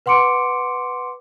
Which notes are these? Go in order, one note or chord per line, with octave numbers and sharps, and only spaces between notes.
B4 F#5 C6 D6 C#7 D7